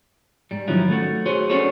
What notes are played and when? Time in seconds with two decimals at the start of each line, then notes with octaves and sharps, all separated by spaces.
0.51 G#2 G3
0.68 D#3 F3 F#3 C#4 E4 F4
0.90 A3 F#4
1.26 F#4 G#4 C5 C#5
1.50 C#4 D4 F#4 G#4 A4 C#5